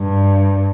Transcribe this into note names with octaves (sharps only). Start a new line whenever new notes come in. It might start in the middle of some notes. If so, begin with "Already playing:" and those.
Already playing: G2